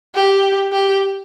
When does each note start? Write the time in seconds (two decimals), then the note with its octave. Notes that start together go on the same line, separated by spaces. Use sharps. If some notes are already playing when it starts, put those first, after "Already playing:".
0.15 G4
0.72 G4